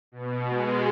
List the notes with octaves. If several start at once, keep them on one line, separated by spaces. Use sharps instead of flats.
B2
G#3